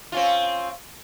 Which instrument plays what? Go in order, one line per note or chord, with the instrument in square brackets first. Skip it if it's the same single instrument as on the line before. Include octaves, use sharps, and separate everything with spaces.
[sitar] C4 C#4 F4